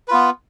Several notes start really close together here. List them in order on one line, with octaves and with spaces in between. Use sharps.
B4 F4 B3